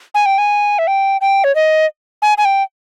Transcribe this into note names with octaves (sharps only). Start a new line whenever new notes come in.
G#5
G5
G#5
E5
G5
G5
C#5
D#5
G#5
G#5
G5